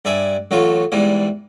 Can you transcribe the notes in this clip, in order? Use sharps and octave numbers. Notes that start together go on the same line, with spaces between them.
G2 D5 E5 G#5
A1 F#3 A3 F4
E2 G#2 E3 G3